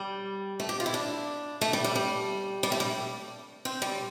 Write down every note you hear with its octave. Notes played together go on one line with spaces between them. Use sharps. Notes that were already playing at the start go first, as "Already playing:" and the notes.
Already playing: G3
A3
G4
F4
E4
D4
A3
G3
G3
G3
G3
A3
G3
C4
G3